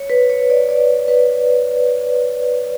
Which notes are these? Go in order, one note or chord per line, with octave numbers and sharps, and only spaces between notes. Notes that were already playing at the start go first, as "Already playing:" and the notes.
Already playing: C#5
B4
C#5
D5
D5
B4